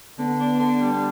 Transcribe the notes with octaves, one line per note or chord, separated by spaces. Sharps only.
D3 B3
D4
D3
G3